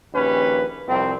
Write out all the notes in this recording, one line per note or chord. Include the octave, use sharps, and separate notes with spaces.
A#1 D#2 C#4 B4
C2 F2 C4